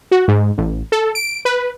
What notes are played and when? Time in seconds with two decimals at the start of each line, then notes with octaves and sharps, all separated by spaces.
0.11 F#4
0.28 G#2
0.58 A1
0.92 A4
1.15 D7
1.45 B4